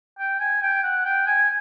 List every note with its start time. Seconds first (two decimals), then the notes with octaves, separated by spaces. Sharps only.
0.19 G5
0.40 G#5
0.62 G5
0.83 F#5
1.05 G5
1.27 G#5